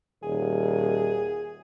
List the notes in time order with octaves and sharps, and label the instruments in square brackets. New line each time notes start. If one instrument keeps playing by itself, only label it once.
[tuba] D#1 [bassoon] G#4